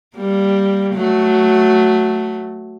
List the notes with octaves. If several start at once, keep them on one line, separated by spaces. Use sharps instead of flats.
G3 A#3
F#3 A3